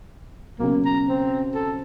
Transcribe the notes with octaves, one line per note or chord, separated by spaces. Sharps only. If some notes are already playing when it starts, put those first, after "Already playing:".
B1 C#3 A#3
A#5
C4
A4